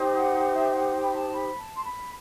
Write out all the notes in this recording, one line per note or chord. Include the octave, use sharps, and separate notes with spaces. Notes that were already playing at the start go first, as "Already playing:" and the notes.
Already playing: D#4 G4 C5
F#5
E5
F#5
G5
B5
A5
B5
A5
C6
B5